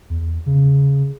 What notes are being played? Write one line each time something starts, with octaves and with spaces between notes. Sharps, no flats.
E2
C#3